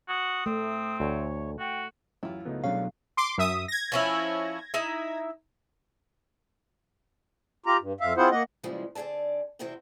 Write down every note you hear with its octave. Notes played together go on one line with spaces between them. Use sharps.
F#4 D#6
A3 C4
D2 C#5
F#4 G5
A1 F#2 E4 F4 G4
C#2 F#3 A3 B3 D#4
C2 B2 F#3 G#3 A3 C#4 D4 F5
C6 D6
F#2 E5 D#6
G#6 A#6
F3 C#4 E4
D#4 E4 E5
F4 G4 A#5
G2
F2 E5 F5
C4 E4 F4 G#4 C5 F#5
A#3 D#5 F#5
A#2 C#3 E3 F3 G3 G#3
D3 C4 G#4 D5 A5
E2 C3 C4 E4 F#4 G5